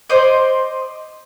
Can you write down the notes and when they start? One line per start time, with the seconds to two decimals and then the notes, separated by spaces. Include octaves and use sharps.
0.10 C5 D5 D#5